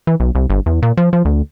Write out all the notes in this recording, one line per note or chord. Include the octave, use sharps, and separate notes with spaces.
E3
B1
C2
G1
E2
A#2
F3
F3
D2